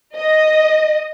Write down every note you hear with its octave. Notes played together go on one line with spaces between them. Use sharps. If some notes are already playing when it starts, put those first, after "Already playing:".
D#5